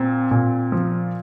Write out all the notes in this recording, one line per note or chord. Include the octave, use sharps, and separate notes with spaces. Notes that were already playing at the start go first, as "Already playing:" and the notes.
Already playing: A#2 C4
A#2
F3